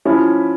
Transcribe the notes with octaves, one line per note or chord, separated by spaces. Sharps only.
F3 C#4 E4